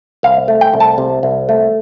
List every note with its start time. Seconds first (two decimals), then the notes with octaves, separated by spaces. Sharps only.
0.23 C2 F5
0.48 A3
0.61 G5
0.74 C2
0.80 A5
0.98 C3
1.23 C2
1.49 A3